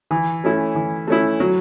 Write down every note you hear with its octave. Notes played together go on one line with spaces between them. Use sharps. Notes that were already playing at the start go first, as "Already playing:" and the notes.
E3
A3 C#4 E4
E3
A3 C#4 E4
F#3